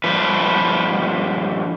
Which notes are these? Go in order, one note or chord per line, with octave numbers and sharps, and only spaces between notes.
G2 F3 B4